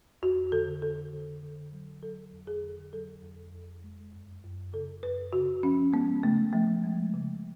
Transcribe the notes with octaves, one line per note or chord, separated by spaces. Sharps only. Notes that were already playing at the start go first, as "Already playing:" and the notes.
F2 F#4
D3 A4
D3 A4
D3
D3
F#3
F#3 A4
F2
G#4
D3
F#3 A4
F2
F2
G#3
F#2
F#2
C#3 A4
F#2 B4
C#3 F#4
F3 C#4
G#3 B3
C#3 A3
F3 A3
G#3
C#3